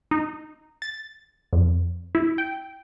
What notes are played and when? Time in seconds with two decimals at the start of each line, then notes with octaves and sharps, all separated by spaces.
0.11 D#4
0.82 A6
1.53 F2
2.15 E4
2.38 G5